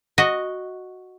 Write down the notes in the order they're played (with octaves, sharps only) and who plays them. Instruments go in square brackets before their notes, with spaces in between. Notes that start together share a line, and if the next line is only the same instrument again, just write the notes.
[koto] F#4 D#5